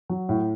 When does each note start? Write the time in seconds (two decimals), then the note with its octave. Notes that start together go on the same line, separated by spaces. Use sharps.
0.09 F#3
0.29 A2